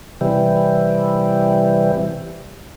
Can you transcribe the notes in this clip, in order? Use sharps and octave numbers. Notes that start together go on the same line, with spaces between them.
C3 E3 G3